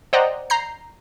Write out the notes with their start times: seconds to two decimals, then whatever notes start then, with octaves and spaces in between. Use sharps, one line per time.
0.13 C5 D5 D#5 F#5 G5 A#5
0.50 A#5 G6 C7